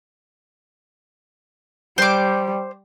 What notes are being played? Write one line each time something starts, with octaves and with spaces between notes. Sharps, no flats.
G3 C5 D6